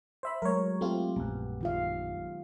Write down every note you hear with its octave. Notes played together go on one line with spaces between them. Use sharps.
C5 E5 B5
F#3 G#3 A3 A#4 C#5
A3 C4 F4 G4
A#1 F#2 B3
D#3 F4 F5